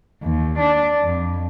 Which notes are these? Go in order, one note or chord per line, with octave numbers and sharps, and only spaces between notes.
D#2
D4
F2